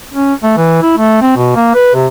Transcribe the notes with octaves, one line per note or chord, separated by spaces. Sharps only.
C#4
A3
E3
E4
A3
C4
B2
A#3
B4
C3